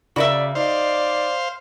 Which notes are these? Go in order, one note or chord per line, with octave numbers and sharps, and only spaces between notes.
C#3 F#4 A#4 D5 E5 B5 F#7
D#4 C5 D5 F5